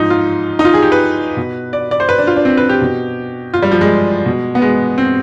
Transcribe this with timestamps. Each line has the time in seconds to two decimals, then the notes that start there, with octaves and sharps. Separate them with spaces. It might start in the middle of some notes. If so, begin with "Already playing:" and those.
Already playing: G#2 F3 D#4
0.10 F4
0.59 D#4
0.65 F4
0.74 G#4
0.82 G4
0.92 B4
1.37 B2
1.73 D5
1.91 D5
2.00 C5
2.09 B4
2.18 D4
2.27 F4
2.36 D4
2.45 C4
2.57 B4
2.69 G4
2.82 B2
3.54 F4
3.63 G3
3.72 F3
3.81 G#3
4.26 B2
4.55 B3
4.62 G#3
4.98 C4